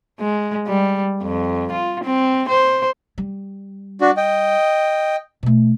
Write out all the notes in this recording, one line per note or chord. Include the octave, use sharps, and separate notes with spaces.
G#3
G3
F2
F4
C4
C5
G3
D4 F#4
D#5 G5
B2 A3